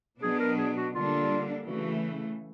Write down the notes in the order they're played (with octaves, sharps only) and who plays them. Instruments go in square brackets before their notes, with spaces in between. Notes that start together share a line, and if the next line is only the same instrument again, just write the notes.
[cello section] B2 F#3 B3 D4 [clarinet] G#4
[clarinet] A#4
G#4
F#4
[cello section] D3 G3 A#3 D4 [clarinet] F4
[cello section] C#3 E3 A3 [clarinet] F#4